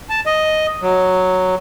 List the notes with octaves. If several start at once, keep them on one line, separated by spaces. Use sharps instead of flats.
A5
D#5
F#3